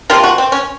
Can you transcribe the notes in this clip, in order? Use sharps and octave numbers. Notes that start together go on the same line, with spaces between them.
C3 F3 A#3 F4
F#4
C4
C#4